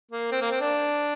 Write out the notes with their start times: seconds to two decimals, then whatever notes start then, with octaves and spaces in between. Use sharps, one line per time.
0.12 A#3
0.32 C4
0.41 A#3
0.51 C4
0.61 D4